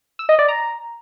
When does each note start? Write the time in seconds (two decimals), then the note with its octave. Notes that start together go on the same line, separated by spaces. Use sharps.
0.19 E6
0.29 D#5
0.39 D5
0.48 A#5